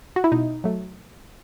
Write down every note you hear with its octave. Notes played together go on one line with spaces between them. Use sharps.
F#4
E4
B2 D#4
F#3 A3